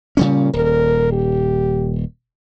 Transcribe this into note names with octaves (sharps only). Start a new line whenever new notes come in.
A#2 C#3 G3 C#4
D#1 A#4
G4